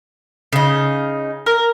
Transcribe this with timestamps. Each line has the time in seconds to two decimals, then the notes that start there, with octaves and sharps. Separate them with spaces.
0.53 C#3 D#4
1.46 A#4